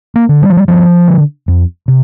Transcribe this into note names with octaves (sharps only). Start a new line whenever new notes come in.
A#3
D3
G3
F3
G3
G2 F3
D3
F2
C3